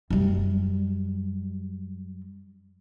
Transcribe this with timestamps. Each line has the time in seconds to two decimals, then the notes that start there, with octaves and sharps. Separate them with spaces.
0.10 F#2 G3